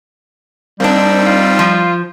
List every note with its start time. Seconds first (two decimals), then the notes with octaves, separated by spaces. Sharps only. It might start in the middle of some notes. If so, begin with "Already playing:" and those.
0.80 G3 A#3 C4 D4 D#4 E6
1.26 F4
1.59 F3